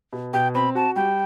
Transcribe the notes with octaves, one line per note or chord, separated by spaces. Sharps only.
B2
B2 G5
C4 B5
F#4 A5
G3 G5